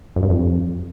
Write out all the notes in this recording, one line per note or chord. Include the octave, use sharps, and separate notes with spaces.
F#2
G2
F2